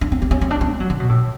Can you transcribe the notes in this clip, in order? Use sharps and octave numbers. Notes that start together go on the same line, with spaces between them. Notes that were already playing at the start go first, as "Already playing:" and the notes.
D4
C4
C4
C#4
C4
D4
D4
G#3
F#3
D3
B2
A2